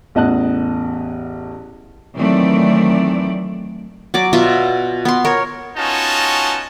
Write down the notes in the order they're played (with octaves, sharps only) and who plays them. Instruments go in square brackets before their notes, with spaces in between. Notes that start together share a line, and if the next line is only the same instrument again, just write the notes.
[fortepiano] A1 E2 D#5 F#5 A5 F#6
[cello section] D#3 E3 F#3 A3 C4 D5
[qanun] F#3 D5 D6
B2 F4 E5
B3 C6
A#4 C#5
[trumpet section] B3 C#4 D#4 F4 F#4 A5